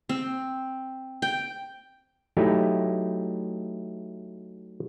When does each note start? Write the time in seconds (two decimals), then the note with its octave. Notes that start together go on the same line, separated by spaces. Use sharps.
0.09 C4
1.22 G5
2.37 F#3 A3 D#4 E4 G4